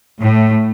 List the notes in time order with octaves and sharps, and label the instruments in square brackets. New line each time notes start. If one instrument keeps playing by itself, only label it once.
[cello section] A2